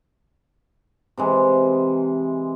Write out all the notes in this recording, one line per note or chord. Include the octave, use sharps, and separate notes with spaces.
C3 E3 G#3